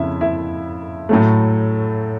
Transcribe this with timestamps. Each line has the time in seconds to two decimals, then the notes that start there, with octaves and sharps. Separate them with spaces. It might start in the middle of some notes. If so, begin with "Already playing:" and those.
Already playing: F2 C#3 E4 E5
0.21 E4 E5
1.09 A2 F#3 A3